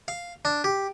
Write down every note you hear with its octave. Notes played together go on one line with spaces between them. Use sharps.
F5
D4
G4